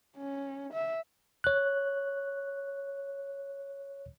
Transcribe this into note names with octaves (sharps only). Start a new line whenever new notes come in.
C#4
E5
C#5 F#6